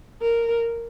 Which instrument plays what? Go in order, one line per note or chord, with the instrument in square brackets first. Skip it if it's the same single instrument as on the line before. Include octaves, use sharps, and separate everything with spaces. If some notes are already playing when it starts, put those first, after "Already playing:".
[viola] A#4